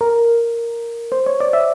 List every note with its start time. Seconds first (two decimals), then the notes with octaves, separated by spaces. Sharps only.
0.01 A#4
1.12 C5
1.26 C#5
1.40 D5
1.53 E5